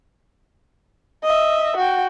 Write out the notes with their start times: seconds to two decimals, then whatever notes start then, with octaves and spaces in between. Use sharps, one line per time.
1.24 D#5 E5
1.77 F#4 G5